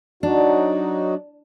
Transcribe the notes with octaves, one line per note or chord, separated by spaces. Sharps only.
F#3 D4 D#4 F#4